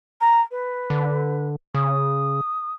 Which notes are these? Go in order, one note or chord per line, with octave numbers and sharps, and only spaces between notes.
A#5
B4
D3
C#3 D#6